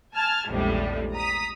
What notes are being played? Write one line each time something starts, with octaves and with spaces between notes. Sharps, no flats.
G#5 A5 F6 G#6
A#1 E2 A2 C3 G3 G#3
A#5 D#6 B6